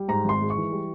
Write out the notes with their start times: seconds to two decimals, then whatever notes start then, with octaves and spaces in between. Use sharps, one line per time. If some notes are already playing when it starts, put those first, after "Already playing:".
Already playing: G3
0.08 G#2 A#5
0.24 G#1 C6
0.41 G#3
0.50 C#6
0.56 E3
0.72 G3